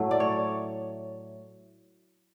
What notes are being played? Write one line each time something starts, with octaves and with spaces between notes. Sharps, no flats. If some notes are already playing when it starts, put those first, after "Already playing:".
Already playing: A2 F#3 A3
D5
C#5